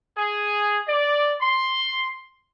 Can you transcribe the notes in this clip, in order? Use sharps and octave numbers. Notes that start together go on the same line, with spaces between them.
G#4
D5
C6